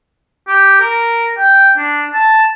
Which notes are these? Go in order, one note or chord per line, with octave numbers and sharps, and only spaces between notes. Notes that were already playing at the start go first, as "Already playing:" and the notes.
G4
A#4
G5
D4
A5